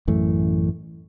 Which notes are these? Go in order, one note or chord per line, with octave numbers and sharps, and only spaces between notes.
A1 F#2 E3 A3